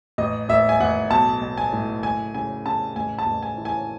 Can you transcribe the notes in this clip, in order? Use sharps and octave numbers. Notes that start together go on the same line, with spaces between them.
A1 D#5
A1 E5
G#5
A1 F#5
B1 A5
B1
G#5
A2
F#1 G#5
C#3 G#5
C#3 A5
A1 G#5
A5
A1
G#5
E3
G#5